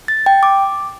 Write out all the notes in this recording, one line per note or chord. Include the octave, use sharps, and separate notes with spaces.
A6
G5
D6